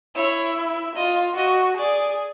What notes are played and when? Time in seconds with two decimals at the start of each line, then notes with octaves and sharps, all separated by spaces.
0.16 E4 C#5
0.96 F4 D#5
1.37 F#4 D#5
1.78 G#4 D5